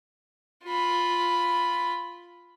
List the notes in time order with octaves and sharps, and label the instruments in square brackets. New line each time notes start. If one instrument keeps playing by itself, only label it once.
[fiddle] F4 B5